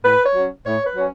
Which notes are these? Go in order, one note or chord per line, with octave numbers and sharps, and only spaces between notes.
A2 B4
C#5
F#3 C#4
A2 C#5
B4
F#3 C#4 C#5